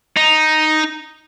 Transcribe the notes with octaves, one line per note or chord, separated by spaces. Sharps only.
D#4